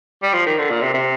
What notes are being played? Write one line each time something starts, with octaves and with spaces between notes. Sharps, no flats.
G3
F3
D#3
D3
A#2
C3
C3